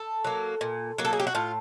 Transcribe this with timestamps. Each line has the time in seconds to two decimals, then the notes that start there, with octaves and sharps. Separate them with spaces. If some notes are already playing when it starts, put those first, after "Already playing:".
Already playing: A4
0.25 F#3 A#3
0.61 A#2
0.98 F#3 A#3
1.05 A4
1.13 G#4
1.20 G4
1.27 F#4
1.35 A2 F4